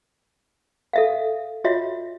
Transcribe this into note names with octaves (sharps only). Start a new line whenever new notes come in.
A4 E5 F5
F4 F#4 C#5 D#5 E5